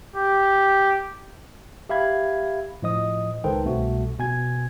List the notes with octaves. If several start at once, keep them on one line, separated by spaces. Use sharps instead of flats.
G4
G4 E5 F5 B5 G#6
A2 F3 D#5 D#6
C#2 D#3 A4 B4 C5 G5
C2 B2 A3 F#4
B2 G#5 G#6